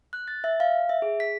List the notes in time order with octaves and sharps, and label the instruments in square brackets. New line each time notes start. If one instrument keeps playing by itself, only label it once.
[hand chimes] F#6
A6
E5
F5
E5
G#4
B6